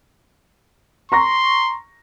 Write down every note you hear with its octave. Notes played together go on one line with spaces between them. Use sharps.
A#5 C6 C#6 A#6